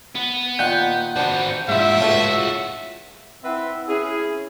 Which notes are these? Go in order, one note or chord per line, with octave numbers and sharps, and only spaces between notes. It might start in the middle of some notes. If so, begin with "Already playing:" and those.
B3
A#2 D#3 F#5 G6
B3 C4 D4 F#4
A#1 G#2 E4 F4 E5
C#2 A2 F4 F#4 A4
C4 E4 B4 E5 F#5
C#4 E4 G#4